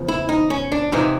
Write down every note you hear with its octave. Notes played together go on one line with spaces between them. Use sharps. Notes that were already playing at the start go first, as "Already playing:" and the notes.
Already playing: E2 C#3 F3
E4
D#4
C#4
D4
F2 C3 E3 D#4